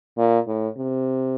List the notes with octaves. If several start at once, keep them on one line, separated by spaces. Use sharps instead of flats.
A#2
A2
C3